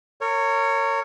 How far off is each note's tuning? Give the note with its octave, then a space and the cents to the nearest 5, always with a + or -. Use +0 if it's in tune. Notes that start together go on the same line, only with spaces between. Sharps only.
A#4 -35 C#5 +0